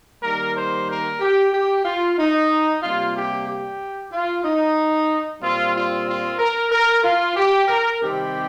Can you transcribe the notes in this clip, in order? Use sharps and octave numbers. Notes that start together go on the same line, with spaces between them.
D#3 G3 A#3 A#4
C5
A#4
G4
G4
F4
D#4
C3 G3 A#3 F4
G4
G4
F4
D#4
A#2 G3 C4 F4
F4
F4
A#4
A#4
F4
G4
A#4
C3 D#3 G3 C4 G4